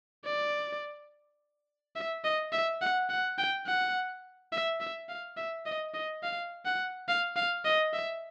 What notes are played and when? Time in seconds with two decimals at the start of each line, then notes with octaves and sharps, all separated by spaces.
0.25 D5
1.96 E5
2.24 D#5
2.53 E5
2.81 F#5
3.09 F#5
3.38 G5
3.67 F#5
4.52 E5
4.81 E5
5.09 F5
5.37 E5
5.66 D#5
5.94 D#5
6.23 F5
6.65 F#5
7.08 F5
7.36 F5
7.65 D#5
7.94 E5